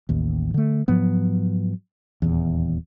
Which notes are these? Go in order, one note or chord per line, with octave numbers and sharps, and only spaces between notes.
A1 D#2
D3 A3
G#2 F3 F#3 B3
D#1 E2